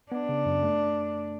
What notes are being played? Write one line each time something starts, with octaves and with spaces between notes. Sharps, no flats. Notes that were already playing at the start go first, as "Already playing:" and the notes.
B3 D4
C#3
F#2
A3